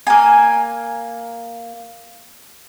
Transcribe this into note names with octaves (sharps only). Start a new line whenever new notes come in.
A#3 G#5